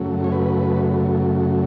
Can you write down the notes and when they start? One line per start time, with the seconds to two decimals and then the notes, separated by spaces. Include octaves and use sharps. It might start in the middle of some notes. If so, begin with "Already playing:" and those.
Already playing: F#2 C#3 F#3 A3
0.24 C#5
0.32 B4